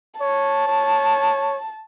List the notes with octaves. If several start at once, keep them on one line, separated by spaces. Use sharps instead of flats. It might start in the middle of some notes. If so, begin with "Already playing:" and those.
C#5 A5
C#5